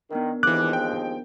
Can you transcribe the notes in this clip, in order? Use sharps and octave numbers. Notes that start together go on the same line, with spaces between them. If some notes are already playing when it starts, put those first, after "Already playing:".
D#3 B3 D4 A#4
D#2 E3 F3 G#3 D6 F#6
G5